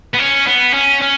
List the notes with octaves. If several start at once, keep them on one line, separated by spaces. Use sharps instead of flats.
B3
C#4
B3
C#4
C#4